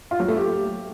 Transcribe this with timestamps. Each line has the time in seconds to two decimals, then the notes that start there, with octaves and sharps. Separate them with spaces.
0.11 F4
0.20 F#3
0.28 A3
0.37 G4